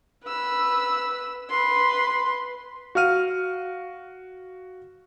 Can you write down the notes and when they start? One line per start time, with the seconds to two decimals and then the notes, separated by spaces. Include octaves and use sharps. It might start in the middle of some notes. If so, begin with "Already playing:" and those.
0.26 B4 E6
1.50 B4 C6
2.95 F#4 F5 F6 D#7